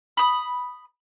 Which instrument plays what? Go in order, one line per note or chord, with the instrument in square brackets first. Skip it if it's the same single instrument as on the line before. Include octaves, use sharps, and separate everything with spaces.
[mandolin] B5 D#6